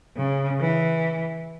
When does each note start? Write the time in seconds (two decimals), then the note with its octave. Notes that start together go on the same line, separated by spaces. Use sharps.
0.18 C#3
0.60 E3